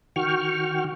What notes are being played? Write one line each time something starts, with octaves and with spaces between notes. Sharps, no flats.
D#3 F#4 G5 C#6 F6